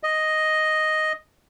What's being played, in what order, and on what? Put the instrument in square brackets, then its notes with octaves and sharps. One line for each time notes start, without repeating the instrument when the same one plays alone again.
[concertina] D#5